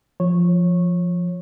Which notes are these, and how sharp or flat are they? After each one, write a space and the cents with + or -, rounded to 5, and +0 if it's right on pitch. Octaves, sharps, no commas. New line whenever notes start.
F3 +0 C#5 -15